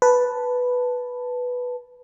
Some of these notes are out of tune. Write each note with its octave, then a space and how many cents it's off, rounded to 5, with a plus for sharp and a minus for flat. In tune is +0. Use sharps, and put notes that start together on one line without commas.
B4 +0 A5 +0